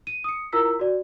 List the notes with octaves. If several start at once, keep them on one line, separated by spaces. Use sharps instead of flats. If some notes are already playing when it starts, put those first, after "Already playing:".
D#7
D#6 C#7
E4 F4 A#4 A#5 E6 B6
F#4 D5